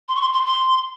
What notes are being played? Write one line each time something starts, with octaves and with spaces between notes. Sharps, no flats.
C6
C#6
C6
C6
C6